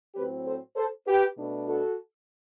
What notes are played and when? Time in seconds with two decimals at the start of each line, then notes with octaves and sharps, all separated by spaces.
0.15 A2 F#3 C4 G4 B4
0.45 A4 C5
0.76 A4 C5
1.06 G4 B4
1.37 B2 A3 D4
1.68 F#4 A4